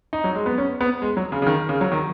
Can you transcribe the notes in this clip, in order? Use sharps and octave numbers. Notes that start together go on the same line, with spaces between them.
D#4
F#3
G#3
B3
C#4
B3
G#3
F#3
C#3
C#3
D#3
C#3
F#3
D#3